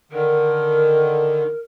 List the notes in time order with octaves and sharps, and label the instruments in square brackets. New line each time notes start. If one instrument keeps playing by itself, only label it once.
[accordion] D3 D#3 [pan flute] A#4